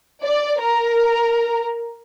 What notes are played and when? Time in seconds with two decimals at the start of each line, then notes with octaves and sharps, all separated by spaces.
0.23 D5
0.61 A#4